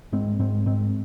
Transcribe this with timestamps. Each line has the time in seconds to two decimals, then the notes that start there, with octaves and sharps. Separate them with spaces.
0.12 G#2 G#3 C4
0.39 G#2 G#3 C4
0.66 G#2 G#3 C4